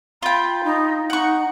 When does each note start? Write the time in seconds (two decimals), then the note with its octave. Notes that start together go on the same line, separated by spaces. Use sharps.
0.22 F4 G5 B5
0.64 D#4
1.10 D#4 F#5 C#6